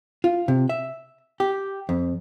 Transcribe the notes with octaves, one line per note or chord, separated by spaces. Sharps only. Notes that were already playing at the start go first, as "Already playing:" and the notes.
F4
C3
E5
G4
F2